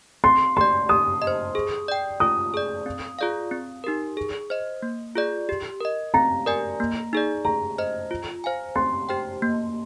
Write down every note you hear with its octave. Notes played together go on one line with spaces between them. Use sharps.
C4 C6
G4 D5 C6
G4 D#6
D#5
C5
G#4
D5 G5
F4 D#6
G#4 D5
C4
F4 G#4 D5 F5
C4
D#4 G4 A#4
G#4
C5 D#5
A#3
F4 G#4 D5
G4
A#4 D#5
C4 A#5
G4 A#4 D5 G#5
A#3
D#4 G#4 D5
G#4 A#5
C5 D#5
F4
C5 F5 G#5
C4 C6
G4 C5 G5
A#3